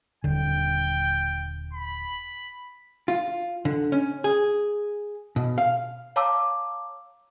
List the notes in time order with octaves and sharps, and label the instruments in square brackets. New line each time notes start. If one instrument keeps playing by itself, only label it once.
[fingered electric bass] D#1 D3 [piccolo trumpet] G5
[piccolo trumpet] B5
[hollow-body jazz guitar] F4
D3
C#4
G#4
B2
F5
[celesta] C#5 F5 A5 A#5 D6 E6